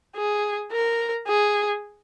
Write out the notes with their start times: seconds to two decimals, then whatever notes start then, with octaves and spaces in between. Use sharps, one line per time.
0.16 G#4
0.72 A#4
1.27 G#4